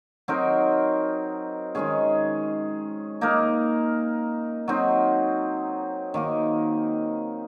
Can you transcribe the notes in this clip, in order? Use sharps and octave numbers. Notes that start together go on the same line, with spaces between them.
F#3 C4 D#4 A#4
D#3 G#3 C#4 G#4
A#3 D#4 A#4
F#3 C4 D#4
D#3 A#3 D#4